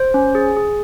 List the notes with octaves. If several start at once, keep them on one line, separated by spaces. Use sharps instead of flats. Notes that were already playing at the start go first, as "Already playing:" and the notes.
Already playing: C5
C#4
G#4
G#4